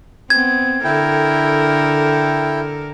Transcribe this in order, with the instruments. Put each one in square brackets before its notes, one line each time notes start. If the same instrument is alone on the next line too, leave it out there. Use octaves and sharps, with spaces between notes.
[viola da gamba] B3 C4 [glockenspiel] G#6
[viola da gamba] D3 A4 A#4 [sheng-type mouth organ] E4 G5